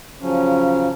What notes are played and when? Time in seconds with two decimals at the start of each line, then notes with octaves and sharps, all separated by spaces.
0.21 C#3 F3 F#3 C#4